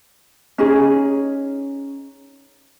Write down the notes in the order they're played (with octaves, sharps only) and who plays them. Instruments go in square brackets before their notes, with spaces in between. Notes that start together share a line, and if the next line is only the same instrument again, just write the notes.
[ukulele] C#4 D#4 G#4